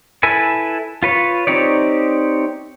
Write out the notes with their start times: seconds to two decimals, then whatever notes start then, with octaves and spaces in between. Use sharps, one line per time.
0.23 E4 A4 B4 G#5
1.03 F4 B4 C#5
1.47 C4 D#4 G4 C#5 D5